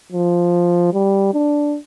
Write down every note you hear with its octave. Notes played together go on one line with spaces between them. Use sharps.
F3
G3
D4